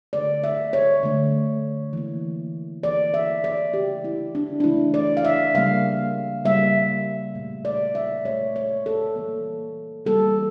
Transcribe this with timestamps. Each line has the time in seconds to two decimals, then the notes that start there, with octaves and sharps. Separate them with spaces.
0.13 D3 A3 D5
0.44 E5
0.73 C#5
1.03 D3 A3
1.93 E3 A#3
2.83 E3 A#3 D5
3.14 E5
3.44 D5
3.74 C#3 E3 A3 G4
4.04 E4
4.35 D4
4.60 D4
4.64 C#3 E3 A3 E4
4.94 D5
5.17 F5
5.25 E5
5.55 C#3 G3 A#3 F5
6.44 C#3 G3 A#3 E5
7.35 A#2 A3
7.65 D5
7.95 E5
8.25 A#2 A3 C#5
8.56 C#5
8.86 A4
9.16 E3 G3 A#3
10.05 E3 G3 A#3 A4